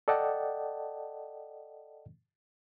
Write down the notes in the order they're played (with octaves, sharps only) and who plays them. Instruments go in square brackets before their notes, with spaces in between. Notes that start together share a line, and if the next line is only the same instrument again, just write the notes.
[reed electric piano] A4 D5 D#5 F#5 G5 A5